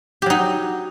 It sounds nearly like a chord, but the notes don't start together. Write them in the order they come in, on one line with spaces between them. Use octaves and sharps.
G4 F#3 D#4